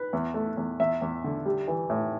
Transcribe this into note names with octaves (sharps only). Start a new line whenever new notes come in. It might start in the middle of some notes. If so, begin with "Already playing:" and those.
Already playing: B4
E2
A3
E2
E2 E5
E2
D3
G3
E3
A2